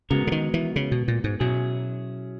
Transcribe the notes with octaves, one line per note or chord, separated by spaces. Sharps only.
C#3 G#3 B3 F#4 A#4
C#3
D#3
E3
C#3
B2
A#2
G#2
B2 F#3 C#4 E4 G#4